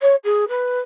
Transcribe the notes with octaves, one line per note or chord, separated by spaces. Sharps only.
C#5
G#4
B4